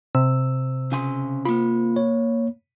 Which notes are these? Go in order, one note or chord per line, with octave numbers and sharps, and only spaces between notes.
C3 E6
C#3 G#5 C6
A#3 F4 B5
C#5